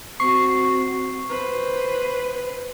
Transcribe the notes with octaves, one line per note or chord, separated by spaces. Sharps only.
C4 F#4 C#6 C7
B4 C5